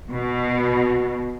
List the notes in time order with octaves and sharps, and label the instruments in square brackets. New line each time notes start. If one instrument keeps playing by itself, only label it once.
[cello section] B2